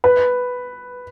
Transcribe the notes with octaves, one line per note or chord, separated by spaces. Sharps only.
B4